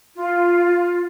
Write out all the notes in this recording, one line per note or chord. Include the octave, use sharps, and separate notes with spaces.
F4